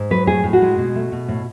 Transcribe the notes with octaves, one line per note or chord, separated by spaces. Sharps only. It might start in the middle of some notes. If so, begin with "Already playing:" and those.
Already playing: G#2
F#3 B4
A2 G#4
A2
F#4
G#3
B2
A3
B2
A2